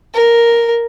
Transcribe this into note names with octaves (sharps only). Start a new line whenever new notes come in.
A#4